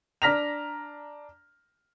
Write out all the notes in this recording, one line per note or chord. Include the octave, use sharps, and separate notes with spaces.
D4 A#5 F6 A#6 B6 F7